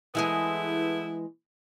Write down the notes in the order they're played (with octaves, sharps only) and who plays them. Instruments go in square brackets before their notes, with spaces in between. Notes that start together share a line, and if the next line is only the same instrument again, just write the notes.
[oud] E3 G#3 G#4 [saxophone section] A3 B3 E4